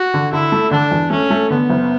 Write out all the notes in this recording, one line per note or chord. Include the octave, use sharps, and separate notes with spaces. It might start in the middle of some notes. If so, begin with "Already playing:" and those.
Already playing: F#4
D3
D3 E4
A3
D3 D4
E2
A3 C#4
A3
D3 B3
F#1